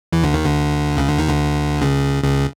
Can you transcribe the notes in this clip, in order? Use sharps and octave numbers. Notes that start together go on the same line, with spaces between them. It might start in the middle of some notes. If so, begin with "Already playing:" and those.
E2 E3
D2 D3
D#2 D#3
D2 D3
C#2 C#3
D2 D3
D#2 D#3
D2 D3
C#2 C#3
C#2 C#3